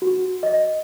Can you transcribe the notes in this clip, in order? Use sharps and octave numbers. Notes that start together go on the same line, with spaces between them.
F#4
D#5